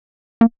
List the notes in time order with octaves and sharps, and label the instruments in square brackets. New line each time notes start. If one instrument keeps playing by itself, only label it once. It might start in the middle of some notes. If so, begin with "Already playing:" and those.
[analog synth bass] A#3